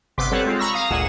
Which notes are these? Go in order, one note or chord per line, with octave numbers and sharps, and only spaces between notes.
G1 C3 B3 C6 D6 B6
G3 C4 A4 B4 C#5 F#5
G#3 C4 F4
A#5 B5 C#6 E6 A#6
F5 A#5 D#6
G1 D2 A#2 G#4 F#5 E7